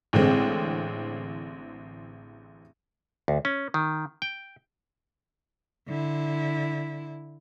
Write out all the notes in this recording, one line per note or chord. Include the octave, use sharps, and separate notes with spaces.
A1 D3 G#3 C4
D2
C#4
D#3
G5
D3 E4